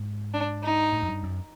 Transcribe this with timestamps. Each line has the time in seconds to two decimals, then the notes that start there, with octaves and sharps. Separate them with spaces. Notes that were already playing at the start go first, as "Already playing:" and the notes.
Already playing: G#2
0.34 D4
0.63 D#4
0.92 A2
1.02 F#2
1.08 G2
1.23 F#2